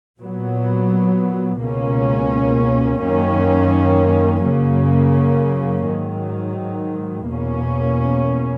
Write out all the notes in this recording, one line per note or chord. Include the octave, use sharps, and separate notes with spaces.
A#2 F#3 B3
C#2 B2 A#3 C#4
F#2 D#3 A#3 C#4
F#2 C#3 F#3 A#3 C#4
G#2 D#3 F#3
E2 B2 A#3 C#4